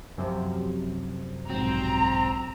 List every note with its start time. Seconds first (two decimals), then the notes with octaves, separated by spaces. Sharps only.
0.18 F#2 C3 F3
1.50 B1 G#2 F#3 C4 A#5